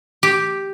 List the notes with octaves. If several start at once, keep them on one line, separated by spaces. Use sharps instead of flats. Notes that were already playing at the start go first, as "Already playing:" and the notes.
G4